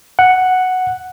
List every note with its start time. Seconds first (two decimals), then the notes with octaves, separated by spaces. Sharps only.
0.19 F#5